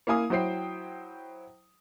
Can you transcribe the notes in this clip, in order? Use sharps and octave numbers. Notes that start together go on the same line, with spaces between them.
A#3 E4 F5 G#5 D#6
F#3 E4 C5 G5 C7